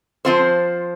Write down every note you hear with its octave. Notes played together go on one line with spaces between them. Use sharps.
F3 C4 F4 C5